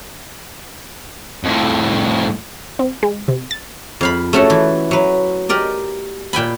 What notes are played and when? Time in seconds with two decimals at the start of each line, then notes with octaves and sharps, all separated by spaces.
1.44 F2 A2
2.79 C4
3.03 G#3
3.28 C3
3.51 A6
4.01 F2 F5 B5
4.33 A3 C#4 F#4 A4 E5
4.50 E3
4.91 F#3 B4
5.49 G4 A#4 D5 D#5
6.33 A#2 G5 G#5 B5